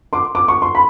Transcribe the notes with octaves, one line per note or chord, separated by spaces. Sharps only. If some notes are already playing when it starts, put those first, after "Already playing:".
C6 D6
D6
C#6
C6
B5